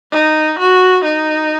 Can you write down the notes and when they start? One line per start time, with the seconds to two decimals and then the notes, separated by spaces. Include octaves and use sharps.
0.12 D#4
0.59 F#4
1.05 D#4